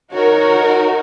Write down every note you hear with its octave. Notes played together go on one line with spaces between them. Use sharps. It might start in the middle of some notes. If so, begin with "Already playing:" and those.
D#4 F#4 A#4 C#5